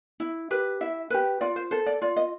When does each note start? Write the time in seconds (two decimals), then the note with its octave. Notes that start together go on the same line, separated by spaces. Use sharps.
0.20 E4
0.51 G4 B4
0.81 E4 E5
1.10 G4 B4
1.41 F4 D5
1.56 C5
1.71 A4 C5
1.86 D5
2.02 F4 D5
2.16 D#5